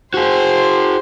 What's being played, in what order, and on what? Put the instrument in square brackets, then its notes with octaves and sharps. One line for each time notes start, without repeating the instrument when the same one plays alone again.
[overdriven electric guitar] F#4 G#4 [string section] C5